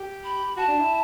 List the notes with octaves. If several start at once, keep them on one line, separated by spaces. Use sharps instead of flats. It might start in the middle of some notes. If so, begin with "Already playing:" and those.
Already playing: G4
B5
F#4 A5
D4
E4